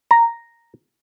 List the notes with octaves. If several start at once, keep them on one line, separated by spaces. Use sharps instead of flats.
A#5